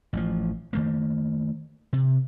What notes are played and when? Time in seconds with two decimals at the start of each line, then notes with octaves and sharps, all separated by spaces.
0.13 A1 F3
0.73 D#3 A3 A#3
1.93 C3